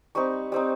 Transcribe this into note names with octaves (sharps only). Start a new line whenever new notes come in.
G3 C4 D#4 C#6
G3 C4 D#4